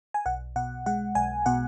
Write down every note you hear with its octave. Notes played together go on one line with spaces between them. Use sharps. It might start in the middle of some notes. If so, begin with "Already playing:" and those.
G#5
B1 F#5
B2 F#5
G#3 F#5
B1 G#5
B2 F#5